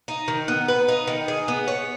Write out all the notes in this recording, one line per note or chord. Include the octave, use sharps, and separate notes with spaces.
D#4
D#3
B3
B4
D#4
D#3
G#4
B3
C#5